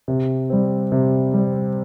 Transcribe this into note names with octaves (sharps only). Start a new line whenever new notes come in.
C3
G3 C4
C3
G3 C4